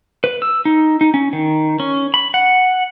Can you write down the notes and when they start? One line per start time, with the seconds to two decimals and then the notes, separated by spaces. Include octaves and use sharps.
0.24 B4
0.42 E6
0.65 D#4
1.01 D#4
1.14 C#4
1.33 D#3
1.80 C#4
2.14 B5
2.34 F#5